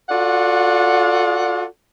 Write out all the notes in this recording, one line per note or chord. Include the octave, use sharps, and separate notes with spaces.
F4 F#4 A4 D5 F#5